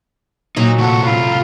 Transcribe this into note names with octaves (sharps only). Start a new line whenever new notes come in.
A#2 F#3 D#4
A2 C3 A3 F#5 A5 C#6
F4 B5